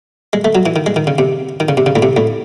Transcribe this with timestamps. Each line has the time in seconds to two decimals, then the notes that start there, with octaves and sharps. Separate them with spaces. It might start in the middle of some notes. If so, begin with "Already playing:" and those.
0.33 G#3
0.45 A3
0.55 F#3
0.66 E3
0.76 D#3
0.86 G#3
0.96 D#3
1.07 C#3
1.18 C3
1.60 D#3
1.69 C#3
1.77 C3
1.86 C#3
1.96 A2
2.03 C3
2.17 A2